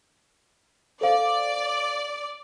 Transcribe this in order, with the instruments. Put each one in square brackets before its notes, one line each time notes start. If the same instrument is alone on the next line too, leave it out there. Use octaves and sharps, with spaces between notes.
[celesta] A4 C5 F5 [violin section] D5